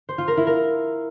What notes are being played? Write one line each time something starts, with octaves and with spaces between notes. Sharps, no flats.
C5
F4
A#4
E4
A#4